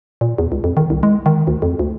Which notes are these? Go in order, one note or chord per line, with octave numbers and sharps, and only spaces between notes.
A#2
E2
C#2
F2
D#3
C2
G#3
D#3
D2
F2
D2